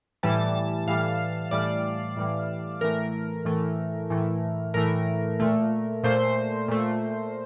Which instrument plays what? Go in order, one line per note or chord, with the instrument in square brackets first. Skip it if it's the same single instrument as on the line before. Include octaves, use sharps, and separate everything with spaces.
[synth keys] A2 E3 G3 A5
A2 E3 G3 F5
A2 E3 G3 D5
A2 E3 G3
A2 E3 A3 A#4
A2 E3 A3
A2 E3 A3
A2 E3 A3 A#4
A#2 A3
A#2 A3 C5
A#2 A3